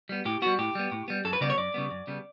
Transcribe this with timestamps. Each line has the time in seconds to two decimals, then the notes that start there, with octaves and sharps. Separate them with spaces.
0.09 G3 B3
0.25 A2 G4
0.42 G3 B3 F#4
0.59 A2 G4
0.75 G3 B3
0.92 A2
1.08 G3 B3
1.25 F#2 A4
1.33 B4
1.41 C#3 G3 B3 D5
1.50 C#5
1.57 F#2 D5
1.74 C#3 G3 B3
1.91 F#2
2.07 C#3 G3 B3